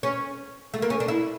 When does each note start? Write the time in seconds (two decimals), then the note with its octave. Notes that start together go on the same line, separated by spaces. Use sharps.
0.03 C#4
0.74 A3
0.82 A#3
0.90 C#4
1.00 D4
1.08 E4